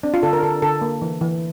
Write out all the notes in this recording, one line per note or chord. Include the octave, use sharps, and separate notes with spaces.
C4 D4
F4
D3 A4
A#4
D3 A4
D3 A4
A#3
E3
E3